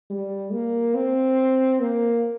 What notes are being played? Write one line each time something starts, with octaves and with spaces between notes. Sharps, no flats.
G3
A#3
C4
A#3